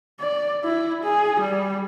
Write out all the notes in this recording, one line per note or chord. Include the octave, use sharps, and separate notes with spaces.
D5
E4
G#4
G3